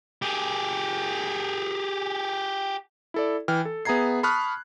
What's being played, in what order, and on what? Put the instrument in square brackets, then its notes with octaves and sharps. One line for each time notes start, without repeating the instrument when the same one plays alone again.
[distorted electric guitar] G4 G#4
[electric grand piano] E4 A4 D5
E3 G5 F6
A4
B3 G#4 E5 A#5 G#6 C7
A5 B5 C#6 D#6 F6 F#6